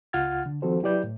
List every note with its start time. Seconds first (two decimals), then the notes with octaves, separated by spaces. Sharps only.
0.13 C#2 F4 F#5 F6 G#6 A6
0.46 D3
0.62 D#3 F3 C4 F#4 A4 C5
0.82 F#3 E4 G4 B4 D5 G6
1.03 A2